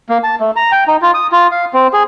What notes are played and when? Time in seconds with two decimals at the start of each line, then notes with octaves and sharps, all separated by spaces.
0.09 A#3
0.23 A5
0.40 A3
0.56 A#5
0.72 G5
0.88 D#4
1.02 F4
1.14 D#6
1.32 F4
1.51 F5
1.74 C4
1.93 G#4